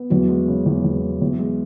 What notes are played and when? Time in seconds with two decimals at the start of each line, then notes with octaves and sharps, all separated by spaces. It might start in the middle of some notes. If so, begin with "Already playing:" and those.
Already playing: B3
0.10 E2 F#3 F#4
0.29 G#3
0.48 C#3
0.66 E2
0.84 E2
1.03 G#3
1.21 E2
1.39 G#3